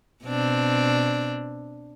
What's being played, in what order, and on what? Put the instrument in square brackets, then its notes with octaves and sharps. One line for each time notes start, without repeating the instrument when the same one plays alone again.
[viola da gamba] B2 C4 D4